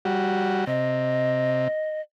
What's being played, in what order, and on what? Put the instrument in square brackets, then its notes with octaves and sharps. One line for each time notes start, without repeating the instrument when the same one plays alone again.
[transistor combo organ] G3 F#4
[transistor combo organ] C3 [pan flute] D#5